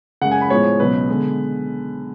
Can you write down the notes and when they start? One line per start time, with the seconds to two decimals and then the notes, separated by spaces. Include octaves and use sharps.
0.21 F#2 C#3 G#3 F#5
0.31 G#5
0.41 B5
0.50 A2 F3 G#3 B3 C#5
0.79 C#2 B2 F#3 B3 B4
1.09 D3 G#3 B3